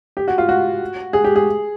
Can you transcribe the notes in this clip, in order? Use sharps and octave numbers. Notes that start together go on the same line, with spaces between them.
G4
F#4
F4
F#4
G#4
G4
G#4